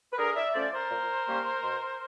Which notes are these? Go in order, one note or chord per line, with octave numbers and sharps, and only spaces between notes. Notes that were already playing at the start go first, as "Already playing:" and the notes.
B4
D3 G#4 A#4
D5 E5
F3 A3 C#4 C5 D5
A#4 C5
A#2
G3 A#3 C#4
B2